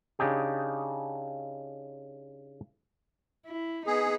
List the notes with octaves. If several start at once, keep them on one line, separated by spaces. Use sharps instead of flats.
C#3 D4 D#4 G4 G#4
E4
B3 D#4 G#4